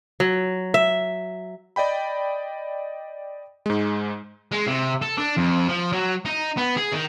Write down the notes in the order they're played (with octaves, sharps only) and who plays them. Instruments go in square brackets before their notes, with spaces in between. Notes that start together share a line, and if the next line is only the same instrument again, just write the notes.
[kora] F#3
E5
[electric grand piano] D5 D#5 G5 B5
G#2 G#3
[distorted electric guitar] G#3
C3
A4
D4
F2
F3
F#3
D#4
B3
G#4
D#3